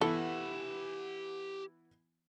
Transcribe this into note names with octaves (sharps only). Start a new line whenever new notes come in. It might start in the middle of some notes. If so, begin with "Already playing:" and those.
E3 B3 E4 G4 A4 F#5